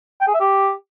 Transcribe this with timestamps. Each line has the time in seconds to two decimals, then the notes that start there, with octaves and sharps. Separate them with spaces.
0.21 G5
0.27 G#4
0.34 E5
0.40 G4